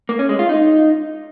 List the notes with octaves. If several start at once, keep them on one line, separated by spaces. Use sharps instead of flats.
A#3
C#4
G#3
F4
D#4